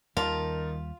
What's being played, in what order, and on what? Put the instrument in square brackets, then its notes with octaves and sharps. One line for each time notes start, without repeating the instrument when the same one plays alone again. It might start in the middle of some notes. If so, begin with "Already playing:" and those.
[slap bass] D#2 G3 [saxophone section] D#3 [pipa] F4 [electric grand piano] A#4 A5